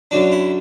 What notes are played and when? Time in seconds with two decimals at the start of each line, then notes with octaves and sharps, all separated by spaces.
0.11 F#2 D3 F#3 D4
0.32 E4